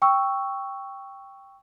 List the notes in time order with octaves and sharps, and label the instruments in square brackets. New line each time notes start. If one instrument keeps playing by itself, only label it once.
[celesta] G5 C#6 E6